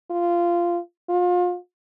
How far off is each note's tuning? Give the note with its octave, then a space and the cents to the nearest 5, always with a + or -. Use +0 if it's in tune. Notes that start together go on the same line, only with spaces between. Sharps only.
F4 -15
F4 +30